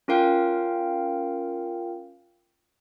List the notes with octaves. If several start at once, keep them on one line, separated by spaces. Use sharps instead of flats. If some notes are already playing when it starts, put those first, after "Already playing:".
C#4 F4 A#4 F5 G5